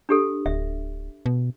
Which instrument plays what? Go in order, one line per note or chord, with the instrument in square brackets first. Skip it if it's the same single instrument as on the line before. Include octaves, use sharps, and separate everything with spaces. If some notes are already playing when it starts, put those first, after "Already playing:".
[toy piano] D4 G4 A4
[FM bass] D1 [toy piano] E5
[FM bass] B2